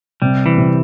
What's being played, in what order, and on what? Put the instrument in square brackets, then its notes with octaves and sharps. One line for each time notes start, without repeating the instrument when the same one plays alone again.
[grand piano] C3 [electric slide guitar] G3
[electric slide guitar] E3
[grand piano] C3